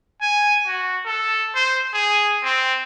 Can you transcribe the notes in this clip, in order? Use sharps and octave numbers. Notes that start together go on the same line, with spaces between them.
G#5
F#4
A4
C5
G#4
C4